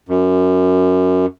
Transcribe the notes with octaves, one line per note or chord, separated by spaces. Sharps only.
F#2